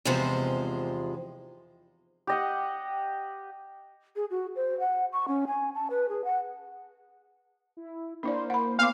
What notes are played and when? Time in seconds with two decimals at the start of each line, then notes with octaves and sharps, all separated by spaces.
0.05 E2 G#2 C3 F3 G#3 C5
2.27 G4 D#5 F#5
4.16 G#4
4.30 F#4
4.56 C5
4.80 F#5
5.13 C#6
5.28 C#4
5.47 G#5
5.75 A5
5.90 B4
6.09 G#4
6.24 F#5
7.77 E4
8.23 A#3 D4 E4 C5 D5
8.50 F#5 B5
8.79 B3 F5 D6